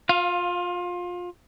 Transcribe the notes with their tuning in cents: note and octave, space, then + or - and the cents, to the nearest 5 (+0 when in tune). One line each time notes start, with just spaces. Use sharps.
F4 +25 F5 +0